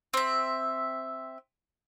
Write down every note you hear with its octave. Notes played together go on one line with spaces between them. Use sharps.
C4 E5